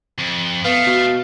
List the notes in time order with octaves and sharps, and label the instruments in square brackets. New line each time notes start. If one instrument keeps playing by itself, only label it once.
[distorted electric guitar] F2
[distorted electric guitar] A3 [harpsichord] B3 [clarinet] F5
[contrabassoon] B2